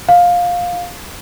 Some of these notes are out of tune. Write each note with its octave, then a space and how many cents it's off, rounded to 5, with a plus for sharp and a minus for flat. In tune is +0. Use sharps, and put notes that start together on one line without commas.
F5 +15